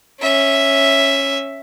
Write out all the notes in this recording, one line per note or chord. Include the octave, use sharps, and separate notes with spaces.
C#4 E5